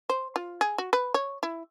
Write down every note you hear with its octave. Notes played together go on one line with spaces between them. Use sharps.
C5
F4
G#4
F#4
B4
C#5
E4